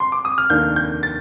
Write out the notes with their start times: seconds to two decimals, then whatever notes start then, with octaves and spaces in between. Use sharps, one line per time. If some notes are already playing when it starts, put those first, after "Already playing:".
0.00 C6
0.12 D6
0.25 D#6
0.38 F6
0.50 F1 D#2 D#3 A#3 D4 G6
0.76 G6
1.03 A6